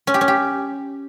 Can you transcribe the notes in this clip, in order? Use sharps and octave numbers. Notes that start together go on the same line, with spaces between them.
C#4
G4
C#4
G4